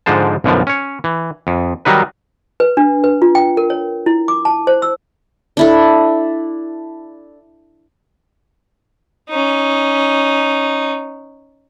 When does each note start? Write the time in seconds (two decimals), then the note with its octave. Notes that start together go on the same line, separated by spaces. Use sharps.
0.06 G#2 D3 F3 G#3 C5 A5
0.44 B1 F#2 B2 D3 F3
0.67 C#4 C#5
1.04 E3
1.47 F2
1.85 D#3 F#3 G3 D#4 B4
2.60 B4
2.77 D4
3.04 B4
3.22 F4
3.35 G5
3.57 A#4
3.70 C#5
4.06 E4
4.28 D6
4.45 A5
4.67 C5
4.82 E6
5.57 D4 E4 A4
9.29 C#4 D#4